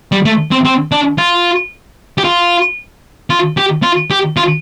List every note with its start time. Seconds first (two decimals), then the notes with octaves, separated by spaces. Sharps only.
0.12 G3
0.25 A3
0.51 C4
0.65 C4
0.92 D4
1.18 F4
2.18 G4
2.24 F4
3.30 F4
3.57 G4
3.83 F4
4.10 G4
4.37 F4